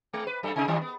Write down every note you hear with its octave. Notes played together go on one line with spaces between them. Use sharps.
G#3
B4
F#2 G3 A4
C3 D#4 G#4
G2 D#3 G3
B3